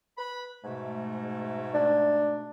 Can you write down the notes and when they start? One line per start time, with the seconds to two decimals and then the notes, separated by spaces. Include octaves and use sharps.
0.18 B4 B5
0.64 G#2 B2 A3
1.74 D4